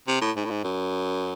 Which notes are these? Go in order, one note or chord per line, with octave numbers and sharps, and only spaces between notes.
C3
A2
G#2
A2
G#2
F#2